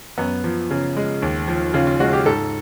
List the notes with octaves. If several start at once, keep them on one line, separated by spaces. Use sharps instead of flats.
F#2 B3
F3
C#3
G#3
D#2
F3
C#3 F4
F4
G#3 F#4
G4
G#2 A4